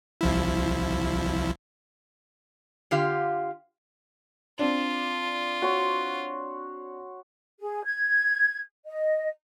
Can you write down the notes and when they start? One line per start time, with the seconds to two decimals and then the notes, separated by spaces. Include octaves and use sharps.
0.21 C2 F3 E4
2.91 D3 F4 G4 F5
4.59 C4 D4 F4
5.62 F#4 C#5 C6
7.60 G#4
7.84 G#6
8.86 D#5